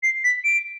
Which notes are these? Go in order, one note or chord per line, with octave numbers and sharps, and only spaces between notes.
C7
B6
D7